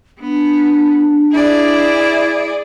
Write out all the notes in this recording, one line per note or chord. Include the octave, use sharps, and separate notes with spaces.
B3 D4
E4 G#4 D5